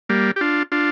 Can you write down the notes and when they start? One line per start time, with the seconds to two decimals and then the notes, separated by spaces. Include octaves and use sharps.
0.09 G3 A#3
0.36 G4
0.41 D4 F4
0.72 D4 F4